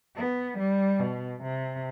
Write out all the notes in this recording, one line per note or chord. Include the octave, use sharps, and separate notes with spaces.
B3
G3
B2
C3